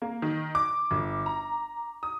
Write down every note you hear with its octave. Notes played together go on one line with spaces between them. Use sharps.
A#3
D#3
D6
G1
A#5
D#6